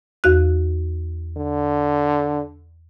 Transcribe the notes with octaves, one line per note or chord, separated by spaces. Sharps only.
E2 F#4 F#6
D3